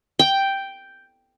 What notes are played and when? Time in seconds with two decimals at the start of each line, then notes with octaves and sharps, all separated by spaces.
0.19 G5